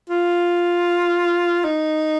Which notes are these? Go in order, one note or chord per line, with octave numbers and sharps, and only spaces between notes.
F4
D#4